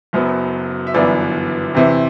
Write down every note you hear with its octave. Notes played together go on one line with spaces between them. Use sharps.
F#1 F#2 F#3 B3
E5
G1 F#2 E3 B3 D5
E2 C3 E3